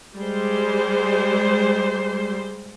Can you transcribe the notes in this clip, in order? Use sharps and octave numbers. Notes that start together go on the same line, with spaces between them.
G3 G#3 C5